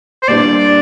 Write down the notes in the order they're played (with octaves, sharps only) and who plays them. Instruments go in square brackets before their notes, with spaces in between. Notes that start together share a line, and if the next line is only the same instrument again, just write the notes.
[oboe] C5
[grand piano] A#2 G3 D4 [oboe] D5